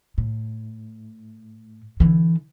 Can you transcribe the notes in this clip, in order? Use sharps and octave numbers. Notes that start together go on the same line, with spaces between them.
A2
D3 E3